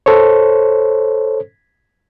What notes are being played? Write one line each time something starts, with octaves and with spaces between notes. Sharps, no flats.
A4 C5 C#5